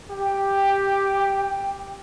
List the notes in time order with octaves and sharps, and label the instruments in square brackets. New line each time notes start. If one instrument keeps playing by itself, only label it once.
[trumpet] G4 [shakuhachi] G5